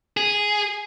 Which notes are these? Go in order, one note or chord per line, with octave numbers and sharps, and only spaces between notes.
G#4